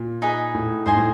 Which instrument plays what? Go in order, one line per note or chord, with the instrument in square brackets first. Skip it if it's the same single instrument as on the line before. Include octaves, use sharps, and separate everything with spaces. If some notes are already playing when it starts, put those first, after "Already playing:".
Already playing: [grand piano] A#2
[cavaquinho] D#4 G#4 B4
[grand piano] A2
[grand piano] G#2 [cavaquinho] C5 D#5 G#5 C6
[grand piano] A2